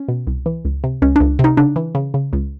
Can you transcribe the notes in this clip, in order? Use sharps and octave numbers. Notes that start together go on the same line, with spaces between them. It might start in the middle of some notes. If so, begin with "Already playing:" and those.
Already playing: C#4
B2
C2
E3
C#2
C3
C#2 C#4
C#2 D4
C3
D#4
C#3 D4
E3
C#3
C#3
C#2